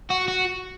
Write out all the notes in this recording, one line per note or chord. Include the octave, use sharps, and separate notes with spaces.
F#4
F#4